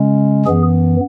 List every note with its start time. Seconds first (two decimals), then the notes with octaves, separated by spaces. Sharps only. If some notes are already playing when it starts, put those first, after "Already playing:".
Already playing: C#3 G#3 C#4
0.46 F#2 E3 B3 G#4